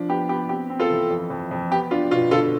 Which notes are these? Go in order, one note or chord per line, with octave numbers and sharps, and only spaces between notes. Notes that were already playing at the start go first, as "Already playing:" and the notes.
Already playing: F3 D4
B3 G4
B3 G4
C4 G4
C4
F4 A4
E3
F2
F2
F2
B3 G4
D4 F4
B2 F4
D3 F4 A4